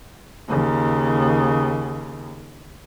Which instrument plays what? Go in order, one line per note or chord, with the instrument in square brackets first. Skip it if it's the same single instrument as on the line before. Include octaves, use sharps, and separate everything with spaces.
[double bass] D#2 C#3